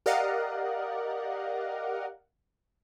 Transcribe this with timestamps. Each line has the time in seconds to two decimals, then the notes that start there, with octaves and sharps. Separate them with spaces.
0.06 G4 A#4 D5 D#5 F5 F#5